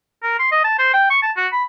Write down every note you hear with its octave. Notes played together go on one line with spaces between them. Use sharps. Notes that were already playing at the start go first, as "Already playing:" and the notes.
A#4
C6
D#5
A5
C5
G5
C#6
A5
F#4
B5